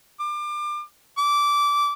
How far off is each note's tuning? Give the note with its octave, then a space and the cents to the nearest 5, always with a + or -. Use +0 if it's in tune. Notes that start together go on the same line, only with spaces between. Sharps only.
D6 +30
D6 -15